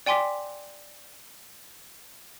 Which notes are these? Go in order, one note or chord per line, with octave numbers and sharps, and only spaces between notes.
D5 G5 G#5 C6 D6 B6